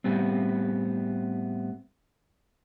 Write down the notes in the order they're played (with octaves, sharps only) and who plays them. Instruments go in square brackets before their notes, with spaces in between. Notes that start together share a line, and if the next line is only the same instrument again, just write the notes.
[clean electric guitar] A2 G3 B3 C4